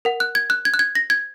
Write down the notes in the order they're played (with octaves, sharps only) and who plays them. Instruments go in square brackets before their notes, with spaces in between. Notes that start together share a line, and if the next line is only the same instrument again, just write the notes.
[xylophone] A#4 F#5
F#6
G#6
F#6
G#6
F#6
G#6
A#6
G#6